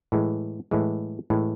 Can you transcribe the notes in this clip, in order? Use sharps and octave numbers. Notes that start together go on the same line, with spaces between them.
A2 E3 G#3
A2 E3 G#3
A2 E3 G#3